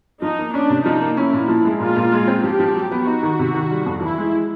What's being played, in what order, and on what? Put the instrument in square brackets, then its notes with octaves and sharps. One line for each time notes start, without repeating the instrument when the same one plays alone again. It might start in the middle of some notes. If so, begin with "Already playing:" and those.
[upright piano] F3 [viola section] D#4
[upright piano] A#3
[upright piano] C#4 [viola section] D4
[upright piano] C3
[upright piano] F3 [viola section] D#4
[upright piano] A#3
[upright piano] C#4 [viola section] E4
[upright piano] A#2
F3
G#3
[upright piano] A#2 [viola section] F4
[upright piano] A#2
G#3
C4
[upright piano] F3 [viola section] G4
[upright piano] F3
F#3
B3
[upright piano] D#4 [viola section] F#4
[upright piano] D#3
C3
D#3
G3
F2
[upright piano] E3 [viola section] E4
[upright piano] G#3